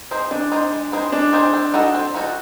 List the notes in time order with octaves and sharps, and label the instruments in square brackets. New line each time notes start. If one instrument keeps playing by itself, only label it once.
[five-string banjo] C4 D#4 G#4 C5
[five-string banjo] G#3 [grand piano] D4
[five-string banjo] C4 D#4 G#4 C5
G#3
C4 D#4 G#4 C5
[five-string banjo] G#3 [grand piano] D4
[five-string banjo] C4 D#4 G#4 C5
C4
D#4 F#4 A4
C4
D#4 F#4 A4